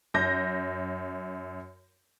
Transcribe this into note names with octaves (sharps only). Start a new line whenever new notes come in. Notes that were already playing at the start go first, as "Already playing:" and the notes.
F#2 G6 A#6